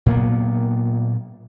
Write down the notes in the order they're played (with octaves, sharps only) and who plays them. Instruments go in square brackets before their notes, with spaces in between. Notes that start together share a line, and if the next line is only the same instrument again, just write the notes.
[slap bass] A#2 F#3 A#3 B3